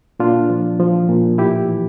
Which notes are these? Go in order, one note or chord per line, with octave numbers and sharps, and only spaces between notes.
A#2 D4 F4
F3
F3
A#2
A2 E4 G4
E3